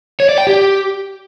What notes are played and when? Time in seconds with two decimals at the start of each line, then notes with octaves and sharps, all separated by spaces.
0.20 C#5
0.29 D5
0.38 G5
0.47 G4